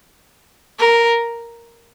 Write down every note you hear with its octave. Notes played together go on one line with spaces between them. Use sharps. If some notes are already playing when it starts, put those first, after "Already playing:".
A#4